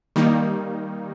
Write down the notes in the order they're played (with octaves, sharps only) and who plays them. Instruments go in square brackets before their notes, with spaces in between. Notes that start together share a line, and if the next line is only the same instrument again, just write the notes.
[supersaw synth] D#3 G3 A#3 D#4